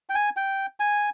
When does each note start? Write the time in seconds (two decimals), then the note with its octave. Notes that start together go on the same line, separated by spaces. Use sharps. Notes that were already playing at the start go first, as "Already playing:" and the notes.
0.09 G5
0.15 G#5
0.37 G5
0.80 G#5